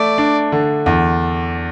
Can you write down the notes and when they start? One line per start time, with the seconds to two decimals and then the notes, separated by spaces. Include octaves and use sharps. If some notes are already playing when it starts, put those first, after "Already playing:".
Already playing: A3 D5
0.18 D4
0.52 D3
0.86 E2